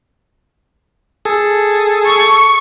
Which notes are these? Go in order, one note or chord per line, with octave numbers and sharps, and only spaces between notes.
G#4 A4
C#6